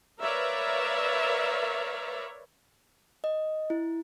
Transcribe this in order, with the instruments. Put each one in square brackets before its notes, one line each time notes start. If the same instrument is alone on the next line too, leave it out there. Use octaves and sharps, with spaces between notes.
[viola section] A#4 B4 C#5 D5 E5 F5
[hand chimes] D#5
E4